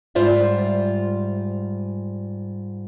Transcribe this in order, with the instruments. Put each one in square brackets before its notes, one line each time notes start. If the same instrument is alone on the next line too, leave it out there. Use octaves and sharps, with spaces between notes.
[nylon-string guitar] G#2 G3 F4 C5 D5 E5